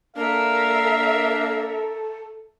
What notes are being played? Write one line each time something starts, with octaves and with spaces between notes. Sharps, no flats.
A#3 D4 A4 A#4 E5 F5